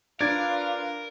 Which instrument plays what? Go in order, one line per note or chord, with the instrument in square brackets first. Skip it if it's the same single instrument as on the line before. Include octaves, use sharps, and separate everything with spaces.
[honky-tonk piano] D4 [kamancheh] F4 B4 [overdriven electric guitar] A#4 [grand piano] G#6 A6 D7